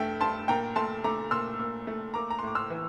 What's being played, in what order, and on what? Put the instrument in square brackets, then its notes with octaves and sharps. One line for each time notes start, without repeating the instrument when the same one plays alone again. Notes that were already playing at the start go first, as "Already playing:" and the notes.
Already playing: [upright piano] G2 A3 E5 G5
G2 A5 C6
A#2 G5 A#5
A3 A5 C6
A3 A#5 D6
A#2 C6 E6
A#2
A3
A#3 A#5 D6
A#5
C6
A2 D6
C6 E6
E3